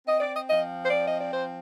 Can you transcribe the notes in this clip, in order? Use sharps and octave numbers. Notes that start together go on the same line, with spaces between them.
C4 D#5
D5
D#5
F3 D#5
C5
C4 D5
D#5
D5
F3 C5